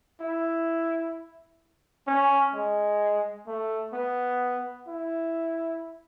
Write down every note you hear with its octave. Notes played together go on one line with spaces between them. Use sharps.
E4
C#4
G#3
A3
B3
E4